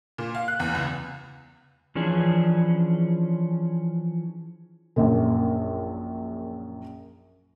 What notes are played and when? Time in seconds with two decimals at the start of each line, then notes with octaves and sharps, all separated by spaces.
0.18 A#2
0.35 F5
0.48 F#6
0.60 E2
0.75 C#2
1.95 E3 F3 C#4 D4 G#4
4.96 A#1 F#2 A#2